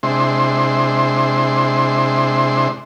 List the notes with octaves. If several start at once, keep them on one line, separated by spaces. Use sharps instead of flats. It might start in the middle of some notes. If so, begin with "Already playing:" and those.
C3 G#3 D4 E4 C5 C6